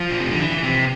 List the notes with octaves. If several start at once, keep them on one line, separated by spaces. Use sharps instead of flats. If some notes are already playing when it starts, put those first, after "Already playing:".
Already playing: F3
A#2
C3
D3
E3
C3